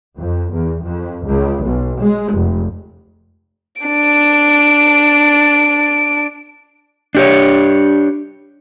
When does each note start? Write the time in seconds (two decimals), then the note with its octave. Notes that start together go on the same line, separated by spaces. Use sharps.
0.17 F2
0.53 E2
0.84 F2
1.25 C#2
1.63 B1
2.01 G#3
2.34 F1
3.82 D4 D7
7.15 D4 G4 C#5